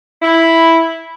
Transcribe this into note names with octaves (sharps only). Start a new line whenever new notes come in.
E4